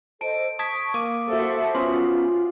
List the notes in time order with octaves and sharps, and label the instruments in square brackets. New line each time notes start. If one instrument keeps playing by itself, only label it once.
[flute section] A4 C5 D#5 [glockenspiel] A5 D7
[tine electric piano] A5 G#6 B6 [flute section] C#6 [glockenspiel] D#6 D7
[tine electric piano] A#3 [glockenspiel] D6 D#7
[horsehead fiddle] F#4 A4 [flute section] C5 E5
[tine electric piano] B3 C#4 F#4 [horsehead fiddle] F4 [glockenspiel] C6